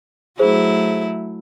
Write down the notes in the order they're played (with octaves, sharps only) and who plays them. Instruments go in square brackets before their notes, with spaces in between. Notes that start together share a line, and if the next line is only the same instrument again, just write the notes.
[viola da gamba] F#3 A3 E4 [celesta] G#4 C5